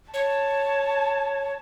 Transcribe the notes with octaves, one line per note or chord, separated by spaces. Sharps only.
C#5 A5